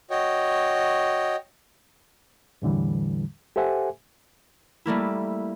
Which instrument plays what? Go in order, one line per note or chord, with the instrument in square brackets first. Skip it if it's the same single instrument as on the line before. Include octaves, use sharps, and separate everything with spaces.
[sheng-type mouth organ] F#4 C#5 D#5 G5
[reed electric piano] E2 A2 D3 E3 G3
G4 A4 C5 E5 F#5 G#5
[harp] G3 A3 A#3 E4